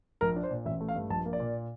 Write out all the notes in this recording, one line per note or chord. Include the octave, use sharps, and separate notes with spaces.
A#1 A#4
D4
C5
A#2
A1 E5
A3
F5
G2
A#1 A5
A#3
D5
A#2